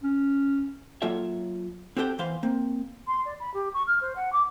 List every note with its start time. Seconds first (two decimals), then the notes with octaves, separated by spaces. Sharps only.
0.03 C#4
1.02 F#3 A#3 F4 A4 C#5 E5
1.97 C4 F#4 G4 A4 C5 G5
2.18 E2 E3 C5 F5
2.43 A#3 C4
3.07 C6
3.25 D5
3.40 B5
3.54 G4
3.74 C#6
3.87 F6
4.01 C5
4.16 F#5
4.33 D6